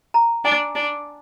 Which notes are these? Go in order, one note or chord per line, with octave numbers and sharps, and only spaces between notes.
A#5
D4 G#5
D4